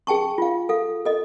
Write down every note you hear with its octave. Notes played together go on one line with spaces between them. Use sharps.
G#4 G5 A5 C#6
F4 F5
A4 F5
A4 D#5